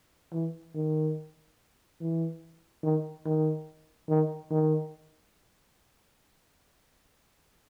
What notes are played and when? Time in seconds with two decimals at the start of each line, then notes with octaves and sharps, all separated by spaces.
0.33 E3
0.75 D#3
2.00 E3
2.83 D#3
3.26 D#3
4.09 D#3
4.51 D#3